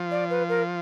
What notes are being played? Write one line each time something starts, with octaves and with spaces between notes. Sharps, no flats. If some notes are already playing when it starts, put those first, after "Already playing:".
Already playing: F3
D5
B4
A#4